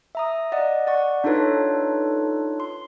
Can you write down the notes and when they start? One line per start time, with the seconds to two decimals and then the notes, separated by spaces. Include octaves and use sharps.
0.15 E5 A#5 D#6
0.52 D5 D#5 F#5
0.87 D5 F#5 C#6
1.24 D4 D#4 F4 A4 B4 C#5
2.60 C6